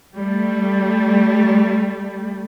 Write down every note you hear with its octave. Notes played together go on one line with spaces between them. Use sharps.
G3 A3